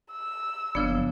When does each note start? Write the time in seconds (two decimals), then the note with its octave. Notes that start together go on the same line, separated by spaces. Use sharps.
0.13 E6
0.75 F#1 C#3 F3 B3 D4